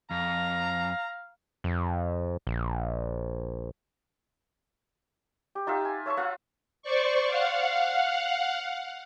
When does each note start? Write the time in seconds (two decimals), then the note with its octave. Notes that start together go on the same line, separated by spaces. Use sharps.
0.11 F2 F5 A#5
1.64 F2
2.47 A#1
5.55 G4
5.67 D#4 F4 G4 E5
5.85 G#5
6.06 C#5 E5 A5 C#6
6.17 F4 F5 F#5
6.82 C5 D5 C#6
7.27 F5 F#5